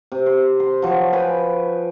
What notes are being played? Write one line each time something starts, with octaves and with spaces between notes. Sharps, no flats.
C3
C5
C6
F3 F#3 C#6
B4 G5 G#5